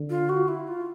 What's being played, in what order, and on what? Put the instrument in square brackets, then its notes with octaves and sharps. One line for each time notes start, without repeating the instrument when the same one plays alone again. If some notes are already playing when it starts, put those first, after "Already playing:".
Already playing: [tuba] D3
[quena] F4
F#4
E4
F4